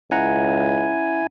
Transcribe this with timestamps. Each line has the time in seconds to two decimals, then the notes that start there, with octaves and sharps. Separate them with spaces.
0.11 C#2 C#4 E4 F#5 G#5 A#5